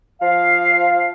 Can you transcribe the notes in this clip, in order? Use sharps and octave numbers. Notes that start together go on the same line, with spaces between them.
F3 F5